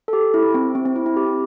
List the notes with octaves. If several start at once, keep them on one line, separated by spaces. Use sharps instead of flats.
A4
G4
E4
C4
C4
C4
E4
E4
G4